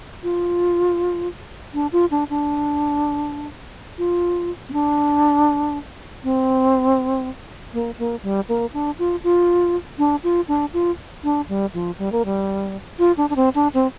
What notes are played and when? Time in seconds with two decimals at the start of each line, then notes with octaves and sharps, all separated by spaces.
0.23 F4
1.74 D4
1.92 F4
2.11 D4
2.30 D4
3.98 F4
4.69 C4
4.73 D4
6.24 C4
7.74 A#3
7.99 A#3
8.23 G3
8.49 A#3
8.74 D4
8.99 F4
9.24 F4
9.98 D4
10.24 F4
10.48 D4
10.73 F4
11.24 D4
11.49 G3
11.74 F3
11.98 G3
12.12 A#3
12.25 G3
12.99 F4
13.17 D4
13.30 D4
13.36 C4
13.55 D4
13.74 C4